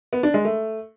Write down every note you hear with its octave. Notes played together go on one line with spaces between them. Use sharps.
B3
D4
G#3
A3